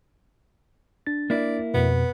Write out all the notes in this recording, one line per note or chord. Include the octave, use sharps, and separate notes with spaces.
D4 A6
A#3 E4 D5
F2 B2 B3